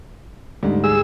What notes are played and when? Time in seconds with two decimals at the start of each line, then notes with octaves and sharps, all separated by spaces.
0.63 D2 G#2 G3
0.84 G#4 E6